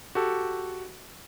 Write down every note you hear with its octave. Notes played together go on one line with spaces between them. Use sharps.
F#4 G4 A4